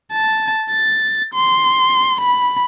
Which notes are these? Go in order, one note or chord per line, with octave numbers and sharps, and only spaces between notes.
A5
A6
C6
B5